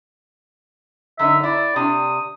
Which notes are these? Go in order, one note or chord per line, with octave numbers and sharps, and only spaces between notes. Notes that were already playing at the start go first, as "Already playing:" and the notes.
F#2 D3 D#4 E5
E4 D5
C3 D4 D#6